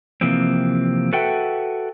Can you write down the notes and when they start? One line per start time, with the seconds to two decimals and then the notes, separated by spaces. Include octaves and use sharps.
0.21 C3 E3 F3 A#3 C4
1.13 F#4 A4 B4 E5 F#5 G5